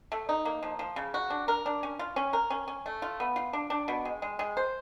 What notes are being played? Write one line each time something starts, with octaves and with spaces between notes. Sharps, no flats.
A3
D#4
A#3
F3
F3
C#3
F#4
D4
A#4
D4
C#4
F4
C#4
A#4
C#4
C#4
A3
F4
B3
F4
D4
D4
B2
G#3
G#3
G#3
C5